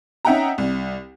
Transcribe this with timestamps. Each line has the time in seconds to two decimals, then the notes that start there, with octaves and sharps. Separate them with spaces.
0.25 C#4 D#4 E5 F#5 G5 A#5
0.58 C2